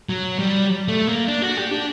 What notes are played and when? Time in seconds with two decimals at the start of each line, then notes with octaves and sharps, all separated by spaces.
0.09 F#3
0.39 G3
0.88 A3
1.07 A#3
1.28 D4
1.42 F#4
1.57 G4
1.71 D4